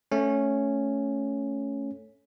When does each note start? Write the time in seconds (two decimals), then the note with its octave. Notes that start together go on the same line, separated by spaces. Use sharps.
0.12 A3 C#4